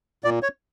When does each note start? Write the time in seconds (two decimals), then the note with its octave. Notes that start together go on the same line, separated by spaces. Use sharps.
0.24 A#2 D5
0.43 C#5